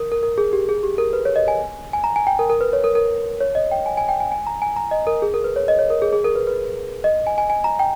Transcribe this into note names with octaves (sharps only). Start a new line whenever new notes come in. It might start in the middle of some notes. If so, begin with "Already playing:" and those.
Already playing: A#4
A#4
A#4
G#4
G4
G#4
G4
A#4
B4
C#5
D#5
G#5
G#5
A#5
G#5
G5
A#4
A#4
B4
C#5
A#4
A#4
C#5
D#5
G5
G#5
G#5
G5
G#5
G#5
A#5
G#5
A#5
D#5
A#4
G#4
A#4
B4
C#5
D#5
C#5
A#4
G#4
G#4
A#4
B4
B4
D#5
G#5
G#5
G#5
A#5
G5